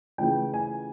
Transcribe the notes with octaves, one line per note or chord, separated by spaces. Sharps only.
C#3 E3 A3 C#4 F4 G5
G#5